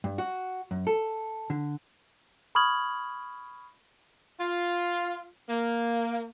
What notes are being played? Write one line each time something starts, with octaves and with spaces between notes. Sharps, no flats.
G2
F#4
F#2
A4
D3
B5 C#6 D#6 F6 G#6 F#7
F4
A#3